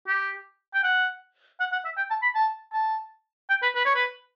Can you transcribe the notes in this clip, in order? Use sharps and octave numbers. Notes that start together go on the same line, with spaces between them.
G4
G5
F#5
F#5
F#5
E5
G5
A5
B5
A5
A5
G5
B4
B4
C#5
B4